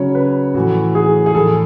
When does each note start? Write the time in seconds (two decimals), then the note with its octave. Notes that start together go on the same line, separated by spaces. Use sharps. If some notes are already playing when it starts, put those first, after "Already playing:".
Already playing: C#3 F#3 C#5
0.15 B4
0.54 A2 E3 F#4
0.95 G#4
1.26 G#4
1.34 A2 E3 A4